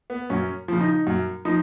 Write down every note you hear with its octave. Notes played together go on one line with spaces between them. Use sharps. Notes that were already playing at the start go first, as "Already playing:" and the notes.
B3
F#2 C#4
C#3 F3
D#4
F#2
F3 D#4